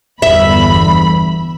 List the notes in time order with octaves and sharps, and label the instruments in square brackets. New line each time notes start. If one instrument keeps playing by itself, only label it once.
[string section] G1 E2 B5 [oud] E5